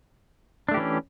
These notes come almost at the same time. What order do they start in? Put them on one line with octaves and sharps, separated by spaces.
D4 A3 G4 E3 C#4